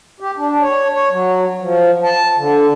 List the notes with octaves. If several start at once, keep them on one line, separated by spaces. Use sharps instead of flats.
G4
D4
C#5
C#5
F#3
F3
A5
D3